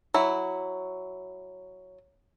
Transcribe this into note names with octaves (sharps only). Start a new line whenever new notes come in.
F#3 E4